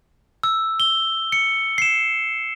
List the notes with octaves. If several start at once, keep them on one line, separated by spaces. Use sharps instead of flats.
E6
G7
C#7
C7 E7